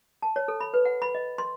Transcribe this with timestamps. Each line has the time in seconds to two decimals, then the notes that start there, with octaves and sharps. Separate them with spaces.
0.22 A5
0.36 C#5
0.48 A4
0.60 B5
0.74 B4
0.85 F#5
1.02 B5
1.15 D#5
1.38 C6